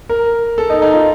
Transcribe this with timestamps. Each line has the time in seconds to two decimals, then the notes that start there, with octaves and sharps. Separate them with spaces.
0.09 A#4
0.58 A4
0.70 D#4
0.82 D#4
0.94 F4